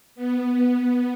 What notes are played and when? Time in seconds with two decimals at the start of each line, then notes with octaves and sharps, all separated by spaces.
0.15 B3
0.76 B3